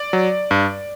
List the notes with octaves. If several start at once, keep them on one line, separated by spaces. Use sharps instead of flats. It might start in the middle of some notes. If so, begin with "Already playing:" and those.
Already playing: D5
F#3
G2